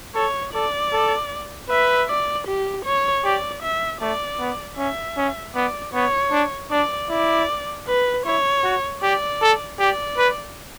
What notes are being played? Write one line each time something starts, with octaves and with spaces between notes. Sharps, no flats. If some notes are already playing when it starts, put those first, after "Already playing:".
A4 C#5
A4 D5
A4
B4 E5
D5
G4
C#5
G4 D5
E5
A3 D5
B3
C#4 E5
C#4
B3 D5
B3 C#5
D4
D4 D5
E4 D5
B4
E4 C#5
F#4
G4 D5
A4
G4 D5
B4